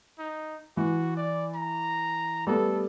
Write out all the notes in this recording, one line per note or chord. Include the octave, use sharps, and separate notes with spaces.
D#4
E3 F#4
D5
A#5
G3 A3 B3 A4